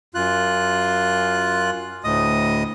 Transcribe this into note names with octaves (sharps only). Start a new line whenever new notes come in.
F#2 F4 F#6
D2 A2 D#5 D#6